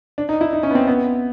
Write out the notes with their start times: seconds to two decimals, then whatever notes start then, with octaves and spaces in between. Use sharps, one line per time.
0.18 D4
0.29 D#4
0.41 E4
0.53 D#4
0.63 C#4
0.71 B3
0.75 C4
0.87 B3